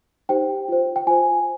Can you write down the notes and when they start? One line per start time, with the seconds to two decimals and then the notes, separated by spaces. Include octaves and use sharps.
0.29 D#4 G4 C5 G5
0.69 F4 C5
0.96 G5
1.07 F4 C5 G#5